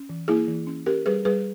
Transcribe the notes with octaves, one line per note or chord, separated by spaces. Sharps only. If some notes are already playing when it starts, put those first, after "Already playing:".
Already playing: C#4
E3
A#3 E4 G#4
E3
C#4
C#4 G4 A#4
G3 G#4 B4
G3 G#4 B4